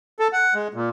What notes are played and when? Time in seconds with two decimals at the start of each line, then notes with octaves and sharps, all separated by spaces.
0.19 A4
0.33 F#5
0.54 G#3
0.74 A#2